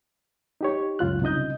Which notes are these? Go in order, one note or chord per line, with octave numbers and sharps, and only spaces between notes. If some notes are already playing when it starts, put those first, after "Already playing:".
D#4 G4 C#5
C#2 F#2 F4 F#6
C2 C#3 D#4 D#5 G6